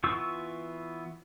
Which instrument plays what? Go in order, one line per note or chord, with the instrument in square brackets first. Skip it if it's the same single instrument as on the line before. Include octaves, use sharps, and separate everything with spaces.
[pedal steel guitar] E3 B3 F4 C#6 E6